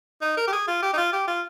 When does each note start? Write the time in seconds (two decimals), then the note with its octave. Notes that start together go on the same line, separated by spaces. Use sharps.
0.21 D#4
0.37 A#4
0.47 G4
0.52 G#4
0.67 F4
0.82 G4
0.93 D#4
0.97 F4
1.12 G4
1.27 F4